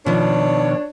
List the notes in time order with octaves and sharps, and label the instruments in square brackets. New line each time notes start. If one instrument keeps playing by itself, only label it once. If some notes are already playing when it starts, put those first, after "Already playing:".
[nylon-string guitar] B2 D#3 F3 [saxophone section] D4 C#5